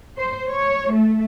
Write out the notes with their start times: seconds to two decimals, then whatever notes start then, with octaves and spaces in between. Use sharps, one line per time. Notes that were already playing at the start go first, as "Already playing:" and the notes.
0.18 C5
0.49 C#5
0.94 A3